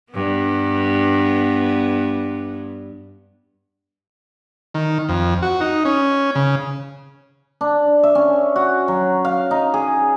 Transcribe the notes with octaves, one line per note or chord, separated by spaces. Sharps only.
G2 B3
D#3
F2
F#4
D#4
C#4
C#3
D4
E5
C#4
F#4
F#3
F5
D#4
G#4